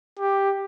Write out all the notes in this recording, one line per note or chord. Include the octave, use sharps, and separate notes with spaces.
G4